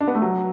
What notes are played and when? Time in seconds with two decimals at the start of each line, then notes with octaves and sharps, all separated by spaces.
0.01 D4
0.08 B3
0.15 A3
0.22 F#3